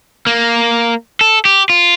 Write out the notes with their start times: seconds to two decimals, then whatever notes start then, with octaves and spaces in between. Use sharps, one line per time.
0.27 A#3
1.21 A4
1.45 G4
1.70 F4